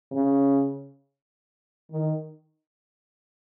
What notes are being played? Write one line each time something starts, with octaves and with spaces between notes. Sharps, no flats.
C#3
D#3